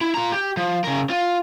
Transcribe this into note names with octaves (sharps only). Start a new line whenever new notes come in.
E4
F4 A#5
G4
F3
C#3 A#4
F4